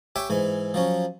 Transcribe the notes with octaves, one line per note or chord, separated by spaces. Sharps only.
G4 C#5 E5 G5 G#5
G#2 E3 G#5
F3 F#3 C#4